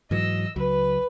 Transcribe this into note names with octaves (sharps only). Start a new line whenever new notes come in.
G#2 E3 F#3 D#5 E6
C#2 F#3 B4